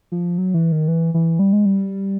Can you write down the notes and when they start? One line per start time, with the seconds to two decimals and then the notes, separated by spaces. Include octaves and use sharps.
0.12 F3
0.38 F#3
0.54 E3
0.72 D#3
0.88 E3
1.14 E3
1.39 G3
1.53 G#3
1.65 G3